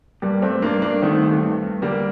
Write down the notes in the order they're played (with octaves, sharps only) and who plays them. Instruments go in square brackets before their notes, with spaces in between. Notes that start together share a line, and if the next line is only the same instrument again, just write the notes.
[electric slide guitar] G2 [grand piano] G3 A#3
[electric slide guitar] G2 [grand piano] A3 C4
[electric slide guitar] G2 [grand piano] A#3 D4
[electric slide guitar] G2 [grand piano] A#3 D4
[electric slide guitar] D#3 [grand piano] A3 C4
[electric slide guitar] G2
G2
G2
[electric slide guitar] D3 [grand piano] G3 A#3